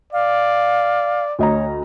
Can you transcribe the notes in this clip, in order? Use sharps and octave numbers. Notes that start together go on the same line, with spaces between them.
D5 F5
D2 C#5 D#5 A#5